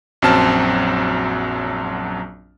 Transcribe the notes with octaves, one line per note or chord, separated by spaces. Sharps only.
A#1 F#2 F#3 C4 A5 F6